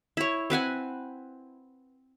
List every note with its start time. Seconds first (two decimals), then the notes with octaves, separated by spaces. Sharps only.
0.17 E4 C#5
0.50 C4 B4 F#5 G#5